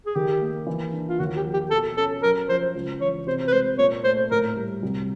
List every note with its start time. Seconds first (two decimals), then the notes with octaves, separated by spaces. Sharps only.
0.06 G#4
0.15 D#3 G4
0.41 A#3
0.67 E3
0.93 D4
1.08 F4
1.19 D#2 F#4
1.37 G4
1.45 F3
1.54 G4
1.70 B2 A4
1.97 C#4 A4
2.23 F#2 A#4
2.49 F3 C5
2.75 C#2
3.00 E3 C#5
3.27 C3 C5
3.48 B4
3.52 G#3 C5
3.78 A#2 C#5
4.04 A3 C5
4.31 A2 A#4
4.56 G3
4.82 C2